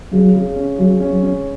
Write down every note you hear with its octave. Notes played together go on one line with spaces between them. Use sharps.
C#3 F#3
C#3
C#4
C#3 F#3
C#4
F#3
C#4